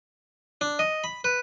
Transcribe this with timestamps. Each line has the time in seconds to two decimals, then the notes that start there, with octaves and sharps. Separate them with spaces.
0.61 D4
0.79 D#5
1.04 B5
1.24 B4